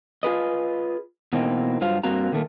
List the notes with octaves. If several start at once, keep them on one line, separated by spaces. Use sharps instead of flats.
F4 G#4 B4 D#5
B2 E3 A#3 C4 D#4
G2 F#3 F4 C5 F5
G2 A#3 C4 F#4 A#5
A#2 D3 D#3 A3 A#3